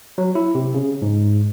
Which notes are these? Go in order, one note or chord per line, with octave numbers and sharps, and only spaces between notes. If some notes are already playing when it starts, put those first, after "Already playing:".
F#3
E4
C3
C#3
G#2